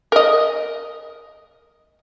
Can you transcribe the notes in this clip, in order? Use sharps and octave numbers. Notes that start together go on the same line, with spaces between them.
A#4 D#5